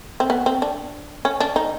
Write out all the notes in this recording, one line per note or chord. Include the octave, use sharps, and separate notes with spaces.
C4
B3
C4
D4
C#4
D4
D#4